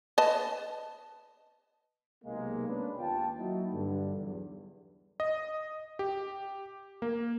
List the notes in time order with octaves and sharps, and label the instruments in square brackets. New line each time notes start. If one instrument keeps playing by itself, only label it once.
[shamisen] B4 D#5 A5
[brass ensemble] B1 C3 G#3 A#3
G#3 B3 C#4 D4 B4
D#2 F4 G5 A5
F#3 A#3 D#4 E4 F#4
G2 D3
B1 E2
[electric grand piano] D#5
G4
A#3